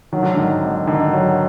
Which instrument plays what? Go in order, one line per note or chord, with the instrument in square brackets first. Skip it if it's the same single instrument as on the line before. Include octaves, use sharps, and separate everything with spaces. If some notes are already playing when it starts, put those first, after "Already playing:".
[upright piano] D#3 [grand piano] F#3
[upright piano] D3
[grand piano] G#2 [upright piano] D#3
[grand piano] G#1
[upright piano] D3 [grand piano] D#3
[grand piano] F#3